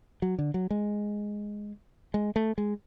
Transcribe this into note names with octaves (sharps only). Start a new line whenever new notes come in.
F#3
D3
F#3
G#3
G#3
A3
G#3